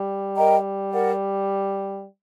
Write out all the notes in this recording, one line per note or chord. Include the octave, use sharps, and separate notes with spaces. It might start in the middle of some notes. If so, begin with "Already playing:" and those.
Already playing: G3
A#4 D#5 G5 A#5
A#4 D5 F#5